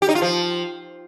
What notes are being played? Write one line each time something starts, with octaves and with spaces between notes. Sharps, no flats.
G4
D#4
F4
F3